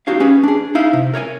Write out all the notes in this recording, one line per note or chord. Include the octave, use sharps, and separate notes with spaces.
D#4 F#4 G4 C#5 F5
C#4 G#4 B4
D4 G#4
D#4 E4 F5
C3
A#4 C#5 D5 G#5